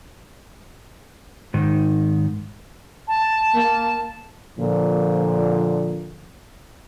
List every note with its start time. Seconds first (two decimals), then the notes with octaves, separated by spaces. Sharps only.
1.54 G#2 D#3
3.08 A5
3.55 A#3
4.58 A#2 D3 F3